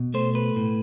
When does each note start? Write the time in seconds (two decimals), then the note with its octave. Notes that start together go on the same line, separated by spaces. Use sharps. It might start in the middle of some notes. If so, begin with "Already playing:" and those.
Already playing: B2
0.14 A3 C5
0.35 B4
0.56 A2